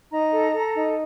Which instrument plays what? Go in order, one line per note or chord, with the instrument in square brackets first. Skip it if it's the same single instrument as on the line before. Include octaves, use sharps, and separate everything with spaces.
[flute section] D#4 A#5
A4
A4
D#4